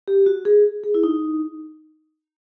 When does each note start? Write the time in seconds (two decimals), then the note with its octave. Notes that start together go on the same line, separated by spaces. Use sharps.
0.08 G4
0.26 F#4
0.45 G#4
0.84 G#4
0.94 E4
1.03 D#4